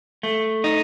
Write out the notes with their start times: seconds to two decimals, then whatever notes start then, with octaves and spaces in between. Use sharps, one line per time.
0.23 A3
0.64 D#4